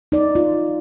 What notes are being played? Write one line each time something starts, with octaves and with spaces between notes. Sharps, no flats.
D#4 D5
F4